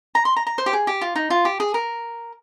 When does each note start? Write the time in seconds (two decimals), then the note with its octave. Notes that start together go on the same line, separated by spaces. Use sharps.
0.15 A#5
0.25 C6
0.36 A#5
0.47 A#5
0.58 C5
0.66 G4
0.73 G#4
0.87 G4
1.01 F4
1.16 D#4
1.30 F4
1.45 G4
1.60 G#4
1.74 A#4